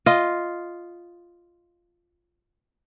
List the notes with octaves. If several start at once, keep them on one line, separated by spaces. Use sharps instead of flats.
F4 D#5